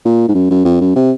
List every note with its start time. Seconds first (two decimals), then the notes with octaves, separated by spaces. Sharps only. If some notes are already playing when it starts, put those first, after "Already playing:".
0.05 A#2
0.28 G#2
0.35 F#2
0.51 F#2
0.65 F2
0.81 F#2
0.96 C3